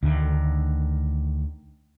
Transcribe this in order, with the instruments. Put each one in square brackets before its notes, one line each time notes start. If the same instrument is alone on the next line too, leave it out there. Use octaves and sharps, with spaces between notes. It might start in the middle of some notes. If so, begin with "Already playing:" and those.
[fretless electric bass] D2 D3 D#3